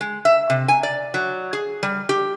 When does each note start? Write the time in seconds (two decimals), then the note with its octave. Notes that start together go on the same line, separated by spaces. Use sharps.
0.01 G#3
0.25 E5
0.50 C3
0.68 G#5
0.83 D5
1.14 F#3
1.53 G#4
1.83 G3
2.09 G4